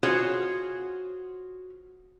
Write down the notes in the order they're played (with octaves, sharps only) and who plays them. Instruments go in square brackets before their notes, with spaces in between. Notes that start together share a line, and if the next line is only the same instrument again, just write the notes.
[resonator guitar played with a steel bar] F4 F#4 G#4 C5 C#5